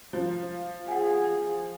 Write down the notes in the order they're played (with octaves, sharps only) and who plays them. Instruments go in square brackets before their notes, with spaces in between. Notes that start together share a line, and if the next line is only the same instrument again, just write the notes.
[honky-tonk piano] F3
[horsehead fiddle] G#4 [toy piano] F#5 G#5